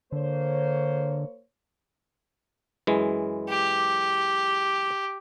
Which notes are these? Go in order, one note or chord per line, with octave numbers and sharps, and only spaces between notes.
D3 A#3 C5 C#5
F#2 E3 G#3
G4